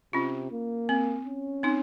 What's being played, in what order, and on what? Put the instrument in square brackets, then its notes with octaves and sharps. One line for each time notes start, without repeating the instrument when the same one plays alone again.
[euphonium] C3 [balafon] C#4 F4
[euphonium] A#3
[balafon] C4
[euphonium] C#4
[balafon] C4 D#4